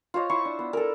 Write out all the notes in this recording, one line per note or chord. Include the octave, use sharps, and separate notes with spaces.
F4 C5 C#5 D#5
E4 C5 C#6
D4
B3
A4 A#4